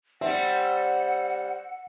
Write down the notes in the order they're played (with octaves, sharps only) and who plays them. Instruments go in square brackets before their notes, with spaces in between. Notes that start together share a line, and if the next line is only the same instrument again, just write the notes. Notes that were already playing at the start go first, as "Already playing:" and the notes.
[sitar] G3 C4 [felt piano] E5 [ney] F#5